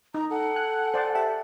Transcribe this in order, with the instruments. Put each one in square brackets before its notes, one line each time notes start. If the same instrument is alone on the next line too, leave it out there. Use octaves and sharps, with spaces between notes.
[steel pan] D#4 [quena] A#5
[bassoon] A4 [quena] F#5
[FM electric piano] G5 G#5 F#6
[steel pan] C5 D5
[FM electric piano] G4 E5 A5